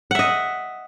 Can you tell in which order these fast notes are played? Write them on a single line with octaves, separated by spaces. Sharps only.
F#5 E5 D#5